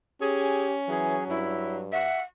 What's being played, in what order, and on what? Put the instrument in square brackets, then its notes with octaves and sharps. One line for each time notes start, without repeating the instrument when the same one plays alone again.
[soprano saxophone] C#4 [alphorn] G4 [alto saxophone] G#4
[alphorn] E3 [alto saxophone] F#3 [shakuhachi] G#4
[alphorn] G2 [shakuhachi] E4
[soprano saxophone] E5 [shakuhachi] F#5